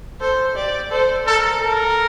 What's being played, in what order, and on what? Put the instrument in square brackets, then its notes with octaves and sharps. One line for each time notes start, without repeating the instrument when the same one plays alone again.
[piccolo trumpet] A4 [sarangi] C5
[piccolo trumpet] G4 [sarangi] D5
[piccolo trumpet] A4 [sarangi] C5
[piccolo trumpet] A4 [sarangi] A#4
[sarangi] A4 [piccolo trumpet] A#4